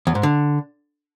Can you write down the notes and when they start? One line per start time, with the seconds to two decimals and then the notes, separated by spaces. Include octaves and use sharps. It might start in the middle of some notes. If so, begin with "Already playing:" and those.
0.07 E2
0.15 G#2
0.23 D3